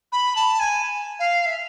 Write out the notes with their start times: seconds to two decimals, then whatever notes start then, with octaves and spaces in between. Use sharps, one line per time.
0.12 B5
0.36 A5
0.60 G#5
1.19 F5
1.46 E5